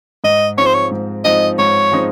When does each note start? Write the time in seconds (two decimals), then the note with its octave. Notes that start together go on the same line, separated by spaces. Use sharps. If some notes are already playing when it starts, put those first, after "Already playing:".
0.24 G#2 D#5
0.57 F3 G#3 C4 D#4 C#5
0.66 C5
0.74 C#5
0.91 G#2
1.24 F3 G#3 C4 D#4 D#5
1.59 G#2 C#5
1.92 F3 G#3 C4 D#4